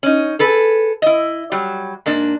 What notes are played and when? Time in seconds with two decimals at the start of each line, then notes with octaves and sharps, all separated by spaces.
0.03 C#4 D#4
0.39 G#4 A4 B4
1.02 E4 D#5
1.52 F#3 G3
2.06 G#2 A#3 D4